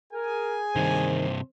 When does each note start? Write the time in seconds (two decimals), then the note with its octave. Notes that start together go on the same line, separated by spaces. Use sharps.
0.13 G#4 A#4 G#5
0.76 G2 C3 D#3 C5